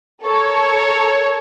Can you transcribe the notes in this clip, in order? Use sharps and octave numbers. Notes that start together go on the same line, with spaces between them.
A4 A#4 C#5